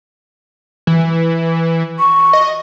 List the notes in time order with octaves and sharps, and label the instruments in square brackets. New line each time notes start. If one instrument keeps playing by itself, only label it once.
[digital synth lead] E3
[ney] C#6
[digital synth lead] D#5